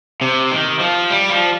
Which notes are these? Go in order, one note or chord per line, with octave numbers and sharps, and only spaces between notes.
C3
D#3
F3
G3
F3